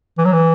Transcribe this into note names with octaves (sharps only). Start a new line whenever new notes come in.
E3
F#3
E3